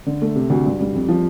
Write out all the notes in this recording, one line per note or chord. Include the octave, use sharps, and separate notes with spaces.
D3
A3
C3
D2
G2
G3
F2
F3